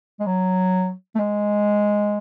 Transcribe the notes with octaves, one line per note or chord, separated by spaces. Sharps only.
G#3
F#3
A3
G#3